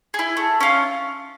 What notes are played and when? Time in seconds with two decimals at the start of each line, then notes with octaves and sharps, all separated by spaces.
0.14 E4 G#4
0.37 A3
0.60 C#4 F4